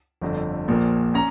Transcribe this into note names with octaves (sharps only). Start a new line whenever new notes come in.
G1 F2 D3
A#1 A#2 F3 A#3
C#4 A#5